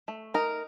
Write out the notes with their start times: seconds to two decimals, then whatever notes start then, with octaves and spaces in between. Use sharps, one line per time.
0.08 A3
0.34 D#4 A#4